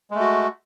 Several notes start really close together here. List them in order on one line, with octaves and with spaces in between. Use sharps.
G#3 A3 F#4